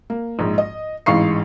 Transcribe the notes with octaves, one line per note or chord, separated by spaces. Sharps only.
A#3
A#1 G#2
D#5
A1 G#2 E3 F5 C#6 C7